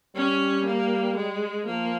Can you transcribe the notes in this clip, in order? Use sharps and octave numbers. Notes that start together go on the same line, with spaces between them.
G3 C#4
A#3
G#3
F3 A#3